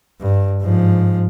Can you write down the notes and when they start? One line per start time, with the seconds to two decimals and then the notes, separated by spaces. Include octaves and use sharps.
0.21 G2
0.61 G#2 F3